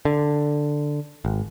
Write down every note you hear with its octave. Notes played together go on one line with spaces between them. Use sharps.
D3
G#1